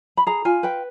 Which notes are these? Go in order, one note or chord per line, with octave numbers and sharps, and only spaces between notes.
B5
G#4 A#5
F4 G#5
B4 G5